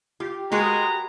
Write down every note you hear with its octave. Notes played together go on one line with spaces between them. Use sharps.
F4 G4
G#3 F#4 A#4 B4 A#5